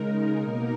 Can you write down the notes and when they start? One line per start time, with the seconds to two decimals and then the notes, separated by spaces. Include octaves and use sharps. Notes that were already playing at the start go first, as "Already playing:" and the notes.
Already playing: C#3 G#3 D#4 A#4
0.42 B2 A#3 D#4 A#4